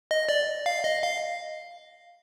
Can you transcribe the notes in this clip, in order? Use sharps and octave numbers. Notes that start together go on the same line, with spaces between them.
D#5
D5
F5
D#5
F5